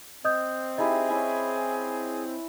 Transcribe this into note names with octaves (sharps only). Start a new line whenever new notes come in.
C4 D#5 D#6 G6
D#4 E4 G4 G#4 D#5
C#4 E4 G#5